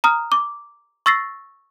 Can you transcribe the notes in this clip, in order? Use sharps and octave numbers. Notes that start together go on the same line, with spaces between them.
A#5 D#6 F6
D6
C#6 E6 A6 A#6 C7